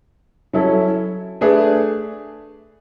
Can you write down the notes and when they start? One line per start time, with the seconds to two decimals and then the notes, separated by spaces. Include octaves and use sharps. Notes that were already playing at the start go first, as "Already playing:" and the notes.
0.53 F#3 C#4 E4 A4
1.41 A3 D4 G#4 B4